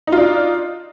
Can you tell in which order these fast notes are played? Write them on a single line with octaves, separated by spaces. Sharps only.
D#4 F4 D4